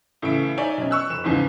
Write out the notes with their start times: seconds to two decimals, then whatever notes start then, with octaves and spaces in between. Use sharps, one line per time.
0.22 A2 C#3 E3 E5 D7
0.57 D#4 C#5 D5 E5 G#5
0.78 B1 C#4
0.91 C#6 E6 F#6
1.10 F1 E7
1.24 E2 G#2 C#3 F3